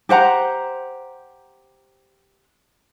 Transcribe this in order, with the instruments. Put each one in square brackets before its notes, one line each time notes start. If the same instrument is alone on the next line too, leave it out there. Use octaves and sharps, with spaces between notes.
[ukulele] G4 C5 F#5 A#5